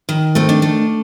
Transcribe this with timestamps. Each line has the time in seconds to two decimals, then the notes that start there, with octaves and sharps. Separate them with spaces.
0.09 D#3
0.35 A3 C4
0.49 D4
0.62 A3